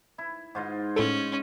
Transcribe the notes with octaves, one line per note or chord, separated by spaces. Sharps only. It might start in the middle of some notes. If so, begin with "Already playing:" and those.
E4
G#2 F4 D#5
A2 C#4 A4